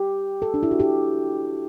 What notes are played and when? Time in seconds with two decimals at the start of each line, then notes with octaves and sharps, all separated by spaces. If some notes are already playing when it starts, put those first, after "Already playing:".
Already playing: G4
0.42 A4
0.54 D4
0.63 E4
0.71 F#4
0.80 G4